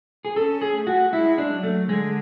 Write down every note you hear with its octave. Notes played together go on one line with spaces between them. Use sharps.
G#4
C#4 A4
G#4
A3
F#4
G#3 E4
D4
F#3
A3
D3 G#3